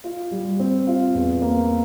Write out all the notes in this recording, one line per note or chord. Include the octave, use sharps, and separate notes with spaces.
F4
G3
C4
F4
E2
A#3